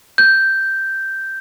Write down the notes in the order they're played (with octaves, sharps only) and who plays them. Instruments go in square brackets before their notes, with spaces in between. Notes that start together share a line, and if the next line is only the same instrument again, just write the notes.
[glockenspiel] G6